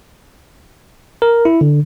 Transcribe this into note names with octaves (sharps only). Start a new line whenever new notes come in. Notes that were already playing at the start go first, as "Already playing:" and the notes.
A#4
E4
D3